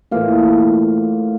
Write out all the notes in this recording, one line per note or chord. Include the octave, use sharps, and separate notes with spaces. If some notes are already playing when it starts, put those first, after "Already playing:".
A2 E3 A#3 F4